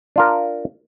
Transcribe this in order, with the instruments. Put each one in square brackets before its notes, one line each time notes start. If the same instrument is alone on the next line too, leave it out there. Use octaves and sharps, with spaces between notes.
[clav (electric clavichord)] D4 F4 A#4